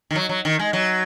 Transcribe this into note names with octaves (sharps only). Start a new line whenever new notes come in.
D#3
F#3
F#3
D#3
G#3
F#3